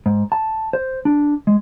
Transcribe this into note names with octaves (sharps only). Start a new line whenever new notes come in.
G#2
A5
C5
D4
G#3